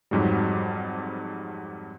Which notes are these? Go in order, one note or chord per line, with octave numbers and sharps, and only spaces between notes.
F2 G#2 F#3 G3